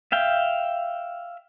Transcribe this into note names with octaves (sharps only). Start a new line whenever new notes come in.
E5 F5 G5